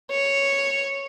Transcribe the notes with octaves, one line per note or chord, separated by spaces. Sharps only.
C#5